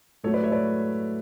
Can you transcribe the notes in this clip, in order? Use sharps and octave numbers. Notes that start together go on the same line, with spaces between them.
A2 F#3 A3 A4 C#5
B4 D5
C#5 E5
B4 D5